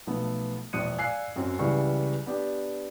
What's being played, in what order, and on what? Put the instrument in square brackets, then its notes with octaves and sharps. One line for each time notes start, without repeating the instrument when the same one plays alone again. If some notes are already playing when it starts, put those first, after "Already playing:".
[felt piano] B1 F3 A3 B3
E1 A#1 D#6 F#6 C#7 D#7
D5 F5 G#5 E6 F#6 C7
F#2 F#3 C4 C#4
C#2 E3 G3 C#6
B3 D4 G4